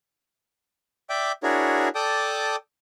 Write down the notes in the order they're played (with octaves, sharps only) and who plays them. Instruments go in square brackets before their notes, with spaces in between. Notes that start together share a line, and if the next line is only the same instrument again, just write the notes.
[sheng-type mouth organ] D5 E5 G5 D6
D4 E4 F#4 G#4 A#4 C#5
A4 D5 G5 A5 D6 D#6